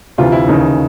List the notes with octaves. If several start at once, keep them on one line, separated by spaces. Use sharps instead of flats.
D2 C3 E3 F4
E4
D#2 C#3 E3 D#4